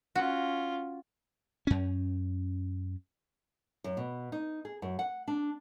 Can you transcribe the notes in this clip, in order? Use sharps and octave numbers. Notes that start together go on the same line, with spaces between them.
C#4 F4 F#4
F#2 C#4
F#2
B2
D#4
G#4
F#2
F#5
D4